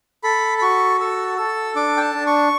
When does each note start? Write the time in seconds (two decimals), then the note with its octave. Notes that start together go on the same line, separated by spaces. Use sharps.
0.23 A4 B5
0.58 B5
0.62 F#4 C#6
1.01 A4 E6
1.38 A4 E6
1.76 D4 D6
1.97 G5
2.01 A5
2.15 D4
2.27 C#6